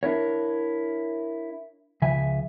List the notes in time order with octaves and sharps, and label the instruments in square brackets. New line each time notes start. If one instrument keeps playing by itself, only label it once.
[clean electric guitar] D4 E4 A#4 C#5
C#2 C#3 F3 E5 G#5